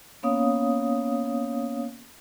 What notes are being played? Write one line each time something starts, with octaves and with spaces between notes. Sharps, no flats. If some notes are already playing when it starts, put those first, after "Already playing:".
A#3 B3 C#4 C#5 F5 D#6